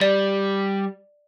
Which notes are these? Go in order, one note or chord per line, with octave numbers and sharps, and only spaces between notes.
G3 D5